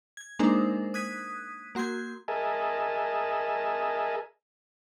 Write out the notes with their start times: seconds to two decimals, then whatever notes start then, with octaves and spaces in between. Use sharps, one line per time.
0.17 G#6
0.39 G#3 A#3 D4 D#4 A#4 C5
0.94 D#6 F#6 G#6 B6 D#7
1.75 A#3 F#4 C6 G6 G#6
2.28 G#4 A#4 D#5 E5 G#5 A5